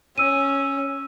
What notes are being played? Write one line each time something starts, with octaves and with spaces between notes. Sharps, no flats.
C#4 E6 D#7